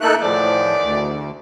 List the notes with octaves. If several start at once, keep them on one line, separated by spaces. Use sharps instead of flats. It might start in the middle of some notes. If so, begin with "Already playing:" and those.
A2 A3 A#3 D#4 A4 F#6
E2 A2 D#3 F3 D5
D2